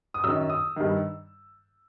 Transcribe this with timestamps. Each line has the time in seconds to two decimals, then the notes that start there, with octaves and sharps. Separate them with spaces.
0.14 D#6
0.24 F#2 D#3 E6
0.50 D#6
0.76 G2 D#3